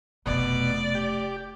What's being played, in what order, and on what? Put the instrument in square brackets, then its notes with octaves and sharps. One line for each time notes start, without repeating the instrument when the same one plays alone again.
[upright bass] F1 A3 [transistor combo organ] B2 [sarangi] D5
[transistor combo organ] G4